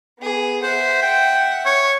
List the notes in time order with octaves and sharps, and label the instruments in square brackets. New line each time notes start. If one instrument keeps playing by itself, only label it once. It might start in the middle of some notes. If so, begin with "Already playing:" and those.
[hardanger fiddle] B3 G#4
[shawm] C5 [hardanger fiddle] E5 F#5
[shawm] G5
C#5